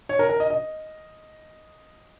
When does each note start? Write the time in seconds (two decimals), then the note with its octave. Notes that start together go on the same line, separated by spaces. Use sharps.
0.09 C#5
0.19 A#4
0.29 A#4
0.40 D#5
0.50 D#5